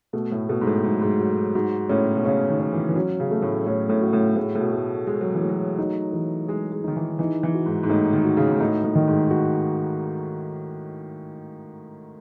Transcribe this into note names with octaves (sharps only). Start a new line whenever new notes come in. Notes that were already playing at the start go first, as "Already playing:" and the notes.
B2 A3
A2
B2 A3
G#2
A2
G#2 F#3
G#2
F#3
G#2 F#4
A2 C#4
B2
C#3 C#4
D#3
C#4
E3
E3
F#3 C#4
C#3
A3
A2
A2 C#4
A2
F#4
A2
A2 G#4
A2
B2
A3
G#3 G#4
F#3
E3
A3
F#3
D#4
E3
G#3 G#4
G#3
D#3 D#4
E3
E3 D#4
E3
F#4
G#2
G#2
A2 D#4
D#3
F#4
C#3
G#2
A2 D#4
A2
D#3
G#2
F#4